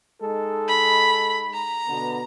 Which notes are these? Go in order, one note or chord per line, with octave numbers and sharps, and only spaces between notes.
G#3 D#4 A4
B5
A#5
B2 D3 B3